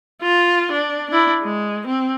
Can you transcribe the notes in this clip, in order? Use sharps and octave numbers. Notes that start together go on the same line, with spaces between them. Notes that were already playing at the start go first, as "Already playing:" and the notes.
F4
D4
D4 E4
G#3
C4